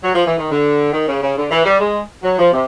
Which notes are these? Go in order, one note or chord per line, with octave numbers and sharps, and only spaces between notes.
F#3
F3
E3
D#3
D3
D#3
C#3
C#3
D3
E3
G3
G#3
F#3
F3
C3